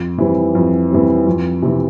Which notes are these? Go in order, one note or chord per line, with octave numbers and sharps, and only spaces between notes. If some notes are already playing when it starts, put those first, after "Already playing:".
Already playing: F2
E3 G3 C4
F2
E3 G3 C4
F2
C3 E3